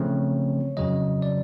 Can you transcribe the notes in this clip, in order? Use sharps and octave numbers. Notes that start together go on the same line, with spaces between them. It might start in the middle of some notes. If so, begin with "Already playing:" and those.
Already playing: C#3 F3 A3 C4 C#5
F2 C#3 F#3 D#5
D5